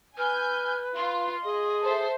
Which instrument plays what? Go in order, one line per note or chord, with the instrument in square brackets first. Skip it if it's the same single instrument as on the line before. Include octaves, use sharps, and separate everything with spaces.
[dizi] B4 [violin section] G#5 G6 [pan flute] F6
[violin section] F4 [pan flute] C6
[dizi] G#4 [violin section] D#5
[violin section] A4 C5 E5